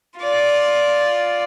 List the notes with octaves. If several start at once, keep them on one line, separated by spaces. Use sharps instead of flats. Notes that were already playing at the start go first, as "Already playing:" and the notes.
F4 D5